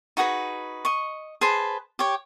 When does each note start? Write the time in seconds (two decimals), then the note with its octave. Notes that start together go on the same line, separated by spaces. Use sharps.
0.17 D#4 F#4 G#4 B4
0.85 D#5 C#6
1.41 G#4 B4 C5 A5
1.99 G4 C#5